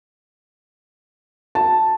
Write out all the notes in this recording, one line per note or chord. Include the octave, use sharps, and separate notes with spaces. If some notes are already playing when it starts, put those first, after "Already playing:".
A5